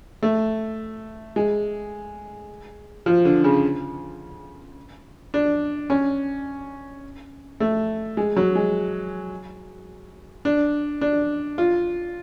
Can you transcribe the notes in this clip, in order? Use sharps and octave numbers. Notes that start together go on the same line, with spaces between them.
A3
G#3
F3
D3
C#3
D4
C#4
A3
G#3
F#3
G#3
D4
D4
F4